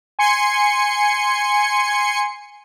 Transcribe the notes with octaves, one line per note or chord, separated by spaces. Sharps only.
G#5 C6 C#7